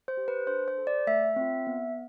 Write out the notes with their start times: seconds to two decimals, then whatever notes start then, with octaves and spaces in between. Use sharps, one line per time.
0.08 C5
0.17 G4
0.28 B4
0.47 D4 C5
0.68 C5
0.78 A4
0.87 D5
1.07 A3 E5
1.36 C4 F4
1.67 B3